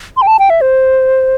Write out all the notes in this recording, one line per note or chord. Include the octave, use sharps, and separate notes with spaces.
C6
G5
A5
G5
E5
C5